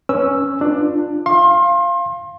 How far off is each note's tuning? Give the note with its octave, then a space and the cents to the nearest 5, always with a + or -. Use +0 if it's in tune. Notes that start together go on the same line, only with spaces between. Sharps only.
C#4 +0 B4 -5 E6 +0
D4 +15 F4 +0
F5 -10 C6 +30